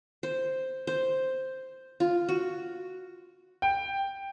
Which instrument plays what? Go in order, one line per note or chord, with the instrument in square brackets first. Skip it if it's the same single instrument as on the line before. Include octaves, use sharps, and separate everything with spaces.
[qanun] C5
C5
F4
F#4
[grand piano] G5